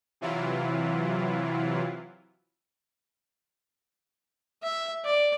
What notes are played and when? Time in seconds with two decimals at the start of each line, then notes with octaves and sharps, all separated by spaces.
0.21 C3 E3 F#3 E4 F4
4.63 E5
5.04 D5